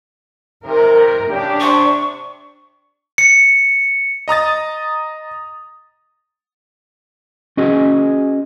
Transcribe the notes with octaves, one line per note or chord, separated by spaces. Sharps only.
C3 D#3 A#4
C#3 D4 G4
C3 C#6
C#7
D#5 A#5 D#6 A6
C#4 F#4 G#4 D#5